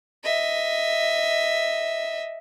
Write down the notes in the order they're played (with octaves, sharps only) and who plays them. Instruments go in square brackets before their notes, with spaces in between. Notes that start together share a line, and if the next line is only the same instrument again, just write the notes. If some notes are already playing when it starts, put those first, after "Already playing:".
[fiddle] D#5 E5